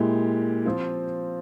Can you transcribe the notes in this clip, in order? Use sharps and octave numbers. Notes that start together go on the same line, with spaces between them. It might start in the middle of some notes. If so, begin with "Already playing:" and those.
Already playing: A#2 G#3 E4 G4
F3 C4 F4